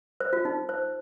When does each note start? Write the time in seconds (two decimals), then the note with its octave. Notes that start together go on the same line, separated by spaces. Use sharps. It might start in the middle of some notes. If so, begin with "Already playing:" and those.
0.20 C5
0.33 F4
0.45 D#4
0.69 C5